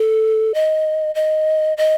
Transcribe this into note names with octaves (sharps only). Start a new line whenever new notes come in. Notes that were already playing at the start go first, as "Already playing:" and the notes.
Already playing: A4
D#5
D#5
D#5